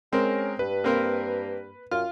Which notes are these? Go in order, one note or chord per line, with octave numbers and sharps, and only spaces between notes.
G#3 C4 C#4 A#4
G2 B4
A#3 C4 A#4
F#2 F4 F6